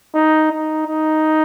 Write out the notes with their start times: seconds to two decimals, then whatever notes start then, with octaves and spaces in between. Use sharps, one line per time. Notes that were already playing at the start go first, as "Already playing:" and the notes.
0.15 D#4
0.51 D#4
0.87 D#4